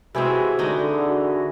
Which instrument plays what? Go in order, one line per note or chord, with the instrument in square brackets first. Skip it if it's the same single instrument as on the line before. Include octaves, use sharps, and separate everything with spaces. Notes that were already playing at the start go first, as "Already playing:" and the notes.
[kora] C3 G#3 C4 [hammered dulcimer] E3 G#4 E5 [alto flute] F#4
[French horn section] D3 [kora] G#3 D4 D#4
[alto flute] F#4